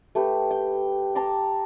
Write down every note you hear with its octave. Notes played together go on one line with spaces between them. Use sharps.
A3 G4 B4
G5
A5 A#5 C6 D6